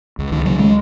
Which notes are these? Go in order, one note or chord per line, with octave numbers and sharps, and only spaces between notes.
C#2
D#3
C#3 F#3
G#3